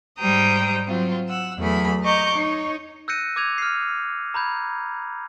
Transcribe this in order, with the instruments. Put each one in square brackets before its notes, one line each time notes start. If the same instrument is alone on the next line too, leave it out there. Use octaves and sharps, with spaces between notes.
[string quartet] G#2 G3 C5 G5 A#5 D#6
F#3 C4 F4
F#5 E6
E2 F#3 A3 G#4 B5
D#5 A#5 C#6 D6 G6
D#4 C#5
[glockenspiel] E6 F#6 G6 A#6 C#7 D#7
D6 E6 G6 G#6 D#7 F7
F6 C7
A#5 B5 G6 G#6